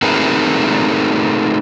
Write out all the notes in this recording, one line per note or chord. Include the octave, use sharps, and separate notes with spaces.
A3 C4 D#4 G#4 A#4 B4